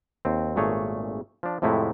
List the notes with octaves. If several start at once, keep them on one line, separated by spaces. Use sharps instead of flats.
D#2 C4
G#1 A#2 A3 G#4 C#5
F3 D4
F2 A2 C3 G#3 A3 E4